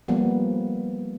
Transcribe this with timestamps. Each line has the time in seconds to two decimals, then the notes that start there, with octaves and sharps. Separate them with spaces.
0.08 F3 G3 A#3 B3